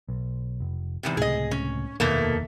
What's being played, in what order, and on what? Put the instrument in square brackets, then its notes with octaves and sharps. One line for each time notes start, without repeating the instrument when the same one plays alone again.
[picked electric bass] B1
F1
[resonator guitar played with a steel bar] E2 G#2 C3
[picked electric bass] C#2 A2 C3 [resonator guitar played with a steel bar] G#4 D#5
[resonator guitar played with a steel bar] C#4
[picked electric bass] F1 D#2 D#3 [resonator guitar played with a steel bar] B2 A3 A#3